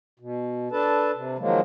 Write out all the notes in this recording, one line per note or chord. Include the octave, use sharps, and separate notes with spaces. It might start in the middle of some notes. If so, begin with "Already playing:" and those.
B2
D4 A4 B4 A5
C3
D#3 F3 F#3 G#3 A#3